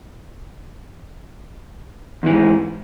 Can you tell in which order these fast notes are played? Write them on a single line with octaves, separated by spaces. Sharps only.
E2 E3 G#2